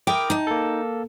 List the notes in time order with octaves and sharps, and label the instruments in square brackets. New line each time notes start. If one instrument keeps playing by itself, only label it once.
[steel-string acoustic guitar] E4 A#4 G5 [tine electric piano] D6 D#6
[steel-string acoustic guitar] D#4 A5
[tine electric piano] A#3 A4